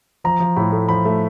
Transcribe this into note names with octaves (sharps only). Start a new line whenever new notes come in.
F3 A#5
F3
A2 B5
A3
F3 B5
A3